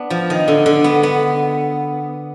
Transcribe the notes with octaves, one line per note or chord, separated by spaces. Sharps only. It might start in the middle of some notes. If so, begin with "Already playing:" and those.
Already playing: B3 D4
F3
D#3
D3
D3
B3
B3